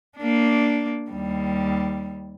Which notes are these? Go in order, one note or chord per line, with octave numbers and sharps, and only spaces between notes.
A#3 D4
D#2 G3